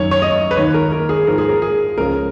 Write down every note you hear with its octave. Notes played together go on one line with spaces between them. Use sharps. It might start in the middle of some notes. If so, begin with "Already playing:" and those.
Already playing: F#2 D#3 C#5
C#5
D#5
B4
D#2 D#3 C#5
A#4
A#4
G#4
G#2 F3 A#4
G#4
A#4
G#4
C#2 C#3 F3 A#4